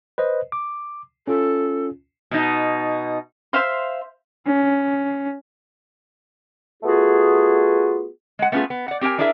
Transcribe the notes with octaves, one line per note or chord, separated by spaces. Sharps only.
B4 C5 D#5
D6
C#4 F4 A4
B2 D#4
C5 E5 F5 C6
C#4
A3 B3 F4 F#4 G#4
G#3 F#5
A3 B3 C#4 E4 F4 G#4
B3
D5 F#5
C4 G4 G#4 A#4 G#5
G3 D4 E4 G#4 A#4 E5